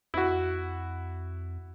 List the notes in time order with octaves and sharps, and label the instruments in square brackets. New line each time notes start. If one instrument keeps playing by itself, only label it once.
[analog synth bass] F2 [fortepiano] E4 F#4